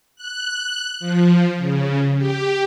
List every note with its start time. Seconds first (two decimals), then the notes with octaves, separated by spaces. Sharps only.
0.16 F#6
1.00 F3
1.57 C#3
2.18 G4